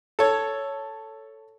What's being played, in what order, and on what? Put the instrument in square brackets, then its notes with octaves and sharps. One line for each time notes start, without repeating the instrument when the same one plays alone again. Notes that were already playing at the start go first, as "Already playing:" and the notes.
[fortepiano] A4 C#5